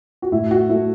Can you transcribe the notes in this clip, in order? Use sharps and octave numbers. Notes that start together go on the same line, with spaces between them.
F#4
A2 E4
F#4
F#3 A3 E4